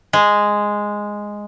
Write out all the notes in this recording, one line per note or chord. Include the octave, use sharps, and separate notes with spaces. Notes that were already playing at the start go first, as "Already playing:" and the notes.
G#3